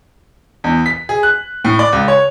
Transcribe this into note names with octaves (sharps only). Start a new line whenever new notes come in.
E2
B6
G#4
F#6
A2
D5
C#2
C#5